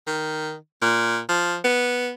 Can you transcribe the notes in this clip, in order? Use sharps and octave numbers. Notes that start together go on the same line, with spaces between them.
D#3
A#2
F3
B3